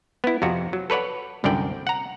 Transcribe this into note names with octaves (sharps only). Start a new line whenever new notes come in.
B3 E4
F2 C3 F#4
F#3
A4 B4 C#5 D5 F#5
C2 F#2 D3 D5 G5
F#5 A#5